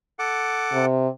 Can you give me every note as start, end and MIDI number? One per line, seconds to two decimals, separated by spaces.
0.19 0.86 69
0.19 0.86 78
0.19 0.86 86
0.73 1.08 48